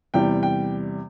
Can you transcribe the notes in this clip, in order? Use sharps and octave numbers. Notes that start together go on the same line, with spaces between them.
E2 C3 G3 G5
G5